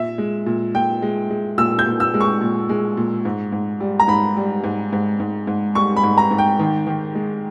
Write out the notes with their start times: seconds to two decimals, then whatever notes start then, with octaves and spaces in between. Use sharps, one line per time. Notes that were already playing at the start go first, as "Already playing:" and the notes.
Already playing: A#2 E5
0.18 G#3
0.46 A#2
0.74 A#2 G5
1.02 G#3
1.30 G#3
1.58 A#2 E6
1.79 G6
1.86 A#2
2.00 E6
2.14 G#3
2.20 C#6
2.41 A#2
2.69 G#3
2.97 A#2
3.25 G#2
3.52 G#2
3.80 G3
4.00 A#5
4.08 G#2 B5
4.37 G3
4.64 G#2
4.93 G#2
5.20 G#2
5.47 G#2
5.75 G3 C#6
5.96 B5
6.03 G#2
6.18 A#5
6.31 G#2
6.38 G5
6.59 D#3
6.87 D#3
7.15 G#3